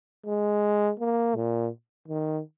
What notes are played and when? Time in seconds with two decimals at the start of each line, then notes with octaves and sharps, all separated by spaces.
0.26 G#3
1.00 A#3
1.36 A#2
2.08 D#3